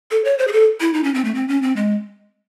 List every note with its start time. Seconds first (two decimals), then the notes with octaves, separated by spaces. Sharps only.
0.11 A4
0.24 C#5
0.38 C5
0.48 G#4
0.52 A4
0.80 E4
0.94 D#4
1.04 C#4
1.14 C4
1.25 A3
1.35 C4
1.48 C#4
1.62 C4
1.76 G#3